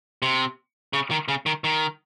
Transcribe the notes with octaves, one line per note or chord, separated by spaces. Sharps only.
C3
C#3
D#3
C#3
D#3
D#3